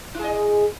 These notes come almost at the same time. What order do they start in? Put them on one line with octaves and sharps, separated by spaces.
E4 G#4 D#5